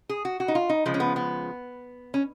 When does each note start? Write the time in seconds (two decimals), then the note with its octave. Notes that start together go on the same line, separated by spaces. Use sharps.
0.09 G#4
0.25 F#4
0.40 F#4
0.48 D#4
0.55 F4
0.70 D#4
0.86 C#3 F3 G#3
0.94 C#4
1.00 B3
1.16 B3
2.14 C#4